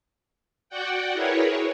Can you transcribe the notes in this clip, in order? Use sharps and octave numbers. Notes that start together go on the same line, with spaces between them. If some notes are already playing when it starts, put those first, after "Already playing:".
F#4 D5 F#5 G5
E4 G#4 A#4 B4 C#5